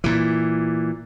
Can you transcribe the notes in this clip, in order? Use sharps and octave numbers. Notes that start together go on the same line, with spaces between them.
A#2 E3